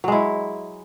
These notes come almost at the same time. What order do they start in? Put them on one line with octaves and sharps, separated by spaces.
F#3 G#3 E4